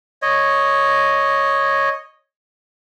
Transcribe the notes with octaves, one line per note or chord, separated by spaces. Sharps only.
C#5 D#5